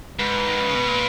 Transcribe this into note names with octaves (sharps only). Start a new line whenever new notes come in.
G#2 B4
D#3
C#3
B2
A#2